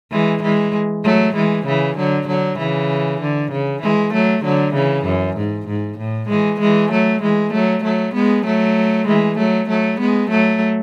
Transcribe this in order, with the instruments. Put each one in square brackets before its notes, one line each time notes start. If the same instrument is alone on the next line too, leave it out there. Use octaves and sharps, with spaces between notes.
[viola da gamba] E3 G#3
E3 G#3
F#3 A3
E3 G#3
C#3 E3
D3 F#3
D3 F#3
C#3 E3
D3
C#3
E3 G#3
F#3 A3
D3 F#3
C#3 E3
F#2
G#2
G#2
A2
E3 G#3
E3 G#3
F#3 A3
E3 G#3
F#3 A3
F#3 A3
G#3 B3
F#3 A3
E3 G#3
F#3 A3
F#3 A3
G#3 B3
F#3 A3